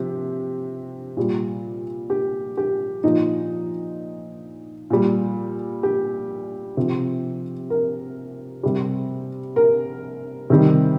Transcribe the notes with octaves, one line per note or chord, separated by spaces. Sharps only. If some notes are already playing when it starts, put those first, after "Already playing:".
Already playing: C3 F3 G4
A#2 G3
G4
G4
A#2 F3 D#4
A#2 G3
G4
C3 F3
A#4
C3 G3
A#4
C3 D#3 G3